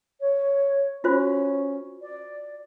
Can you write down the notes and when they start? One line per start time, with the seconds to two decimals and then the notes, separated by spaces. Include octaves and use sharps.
0.21 C#5
1.04 C#4 F4 F#4 C5
2.02 D5